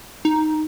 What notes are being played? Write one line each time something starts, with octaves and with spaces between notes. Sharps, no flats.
D#4